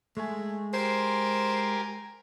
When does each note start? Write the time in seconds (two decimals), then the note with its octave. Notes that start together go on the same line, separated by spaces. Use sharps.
0.17 G#3 A3 G#4
0.73 G4 A#4 C5 G#5